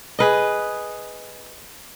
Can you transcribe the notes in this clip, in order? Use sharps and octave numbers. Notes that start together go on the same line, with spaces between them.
G#4 B4 D#5